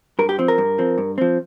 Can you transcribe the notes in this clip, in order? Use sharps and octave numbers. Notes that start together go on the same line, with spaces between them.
G2 A#4
G4
F3 C4
A#4
G2
F3 C4
G2
F3 C4